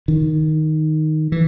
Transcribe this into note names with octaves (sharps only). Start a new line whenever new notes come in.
D#3
E3